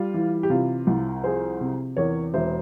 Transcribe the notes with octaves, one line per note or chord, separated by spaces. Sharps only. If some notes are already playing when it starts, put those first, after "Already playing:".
Already playing: G3 F4
E3
G4
C3 F4
C2
F3 G#4 C5
C3
E2 A#4 C#5
E1 C5 E5